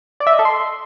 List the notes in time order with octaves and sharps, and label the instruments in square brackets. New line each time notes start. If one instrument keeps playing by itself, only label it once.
[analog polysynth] D5
E5
D#5
A4
C6